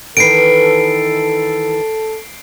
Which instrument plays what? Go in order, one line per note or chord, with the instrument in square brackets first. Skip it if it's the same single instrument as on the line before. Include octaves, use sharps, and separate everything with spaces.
[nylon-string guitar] D#3 E3 B4 [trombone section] A4 [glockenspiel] C7 D7